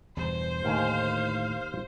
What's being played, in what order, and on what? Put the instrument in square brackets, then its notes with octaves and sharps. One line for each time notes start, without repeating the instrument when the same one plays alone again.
[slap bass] E2 G2 B2 [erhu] C5
[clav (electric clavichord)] D#2 G#5 [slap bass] A2 D3 D#3 [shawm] F5